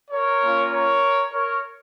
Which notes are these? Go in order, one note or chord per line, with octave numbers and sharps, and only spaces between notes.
A#4 C#5
A#3 C#4 F4
A#4 C#5
A#4 C#5